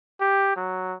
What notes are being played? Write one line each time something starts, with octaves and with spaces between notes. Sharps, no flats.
G4
F#3